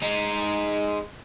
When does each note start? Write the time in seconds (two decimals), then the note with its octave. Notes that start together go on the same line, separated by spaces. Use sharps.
0.02 G#3 D#4